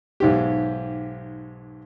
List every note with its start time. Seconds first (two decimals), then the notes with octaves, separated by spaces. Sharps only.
0.20 B1 G#2 G4